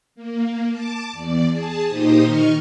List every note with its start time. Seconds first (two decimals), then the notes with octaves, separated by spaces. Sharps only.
0.15 A#3
0.70 A5 D6
1.13 E2 D5
1.49 G#4 A5
1.86 A#2 D#4 G4 C5 D#6
2.24 D#3 D#4 D#5 C#6 F6